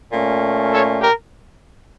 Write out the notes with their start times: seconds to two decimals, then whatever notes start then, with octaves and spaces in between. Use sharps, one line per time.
0.13 A#2 A3 C#4
0.72 A4 C#5
1.00 G4 A#4